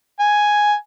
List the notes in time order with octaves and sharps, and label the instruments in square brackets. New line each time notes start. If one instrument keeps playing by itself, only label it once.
[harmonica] G#5